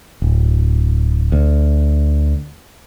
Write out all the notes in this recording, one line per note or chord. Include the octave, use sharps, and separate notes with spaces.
D1
D2